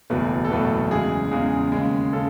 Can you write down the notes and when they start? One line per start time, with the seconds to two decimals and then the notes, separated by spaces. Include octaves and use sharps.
0.10 F#1 E2 B2 F#3 A3 B4
0.45 A4
0.50 F#1 E2 B2 F#3 A3 B4
0.91 E2 C#3 G#3 G#4
1.31 E2 C#3 G#3 G#4
1.72 D#2 C#3 G#3
2.13 C#3 A4